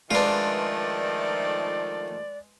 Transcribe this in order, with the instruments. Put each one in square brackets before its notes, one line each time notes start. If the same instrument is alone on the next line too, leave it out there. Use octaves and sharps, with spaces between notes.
[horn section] D#3 F3 A3 [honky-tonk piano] G#3 B4 [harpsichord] D4 F4 [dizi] D5